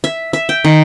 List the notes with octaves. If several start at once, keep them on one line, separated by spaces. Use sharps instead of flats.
E5
E5
G5
D#3